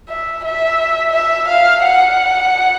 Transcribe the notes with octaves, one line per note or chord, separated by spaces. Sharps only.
E5
E5
E5
F5
F#5